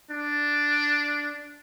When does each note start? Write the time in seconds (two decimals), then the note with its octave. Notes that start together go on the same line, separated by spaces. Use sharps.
0.11 D4